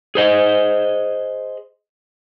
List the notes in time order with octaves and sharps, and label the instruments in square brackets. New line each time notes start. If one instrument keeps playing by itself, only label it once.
[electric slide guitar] G#4 C5 D#5